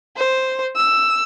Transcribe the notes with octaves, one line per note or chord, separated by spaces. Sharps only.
C5
E6